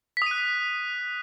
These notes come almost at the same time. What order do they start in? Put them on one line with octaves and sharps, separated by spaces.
B6 D#6 D#7 F#6